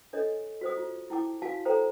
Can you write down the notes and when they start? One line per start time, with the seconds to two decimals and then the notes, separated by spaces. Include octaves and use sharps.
0.13 D4 A4 C#5 D#5
0.61 F#4 C5 D#6
0.77 F4
1.10 E4 G5 A5 D6
1.42 F#4 F5 G#5 A5
1.65 A4 C5 G5 A#5